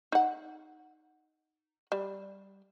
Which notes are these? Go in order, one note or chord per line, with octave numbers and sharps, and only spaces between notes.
D#4 F#5
G3